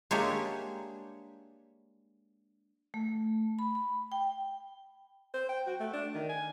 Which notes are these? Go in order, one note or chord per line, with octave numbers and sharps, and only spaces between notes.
G#3 A#3 D4 G4 C#5 E5
A3
B5
B5
G5
C5
G5
F#4
A3
D4
D#3
G#5